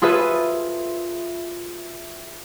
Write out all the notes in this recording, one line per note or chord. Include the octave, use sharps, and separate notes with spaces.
F4 G#4 A4 B4 E5